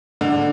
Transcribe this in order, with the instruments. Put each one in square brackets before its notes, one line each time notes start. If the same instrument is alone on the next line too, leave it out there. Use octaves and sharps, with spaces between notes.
[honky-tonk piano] D3